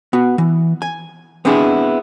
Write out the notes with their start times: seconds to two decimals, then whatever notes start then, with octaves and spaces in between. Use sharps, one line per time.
0.13 B3 F#4
0.38 E3
0.82 G#5
1.45 B3 C4 D4 E4 G#4